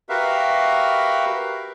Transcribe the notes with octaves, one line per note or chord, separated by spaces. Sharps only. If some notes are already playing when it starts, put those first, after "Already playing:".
F#4 G4 A#4 B4 E5 F5